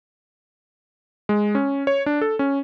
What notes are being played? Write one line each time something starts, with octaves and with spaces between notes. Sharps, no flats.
G#3
C#4
C#5
D4
A4
C#4